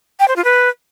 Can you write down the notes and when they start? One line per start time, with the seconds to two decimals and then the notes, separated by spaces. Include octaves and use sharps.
0.20 G5
0.28 C5
0.36 F4
0.44 B4